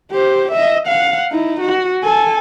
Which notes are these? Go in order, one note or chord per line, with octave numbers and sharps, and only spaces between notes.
G4 C5
D#5 E5
F5 F#5
D#4 E4
F#4
A4 G#5